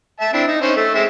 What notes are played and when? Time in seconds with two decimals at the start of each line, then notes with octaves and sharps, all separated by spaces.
0.21 E5 A5
0.33 C4 D4 E4
0.48 D#4
0.62 C#4 D#4 C5
0.76 A3
0.94 G#3 C4 E5